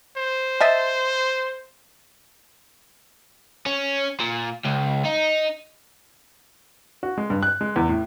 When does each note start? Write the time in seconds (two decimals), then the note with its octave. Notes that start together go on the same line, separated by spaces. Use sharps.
0.18 C5
0.61 D#5 E5 A5
3.66 C#4
4.20 A#2
4.65 C#2
5.05 D#4
7.03 F#4
7.18 G#3
7.30 G2
7.43 F#6
7.61 G#3
7.76 E2
7.89 A2